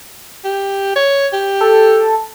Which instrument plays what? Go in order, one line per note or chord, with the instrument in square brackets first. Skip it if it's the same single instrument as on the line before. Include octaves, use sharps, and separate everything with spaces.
[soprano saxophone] G4
C#5
G4
[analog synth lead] A4